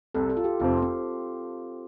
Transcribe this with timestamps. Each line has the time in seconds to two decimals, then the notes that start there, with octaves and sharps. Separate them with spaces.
0.15 C2 C3 G3 A4
0.30 A4
0.37 F4
0.44 G4
0.60 F1 F2 F3 C4 F4
0.82 C4